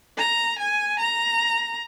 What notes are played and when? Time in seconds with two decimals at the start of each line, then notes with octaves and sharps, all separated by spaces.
0.18 A#5
0.59 G#5
0.99 A#5